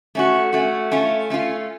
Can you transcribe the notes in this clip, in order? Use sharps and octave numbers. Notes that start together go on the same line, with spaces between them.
A3 C#4 F#4
A3 C#4 F#4
A3 C#4 F4
A3 C#4 F4